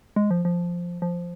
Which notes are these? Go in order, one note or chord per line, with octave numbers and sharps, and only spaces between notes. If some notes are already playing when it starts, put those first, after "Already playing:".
G#3
F3
F3
F3